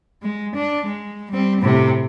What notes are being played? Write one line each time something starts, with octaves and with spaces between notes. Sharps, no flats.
G#3
D4
G#3
G3 C4
A2 C3